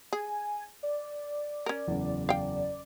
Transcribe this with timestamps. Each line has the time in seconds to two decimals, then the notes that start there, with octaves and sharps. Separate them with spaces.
0.13 G#4 G#5
0.83 D5
1.66 C#4 A#4
1.87 F#1 E2
2.29 F5 G5